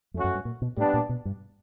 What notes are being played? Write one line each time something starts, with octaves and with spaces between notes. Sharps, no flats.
F2 A3 C#4 F#4
F#2
G2
A#2
B2
A2 G3 B3 D4
A#2
B2
G2